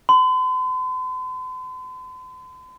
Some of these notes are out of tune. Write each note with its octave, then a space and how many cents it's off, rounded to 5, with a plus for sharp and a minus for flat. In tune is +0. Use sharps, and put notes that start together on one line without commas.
C6 -45